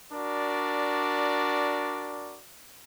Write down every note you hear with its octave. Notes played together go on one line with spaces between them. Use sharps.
D4 F#4 A#4 D5